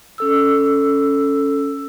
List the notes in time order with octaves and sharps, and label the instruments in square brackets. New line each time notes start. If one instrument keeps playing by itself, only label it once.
[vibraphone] C#4 A4 E6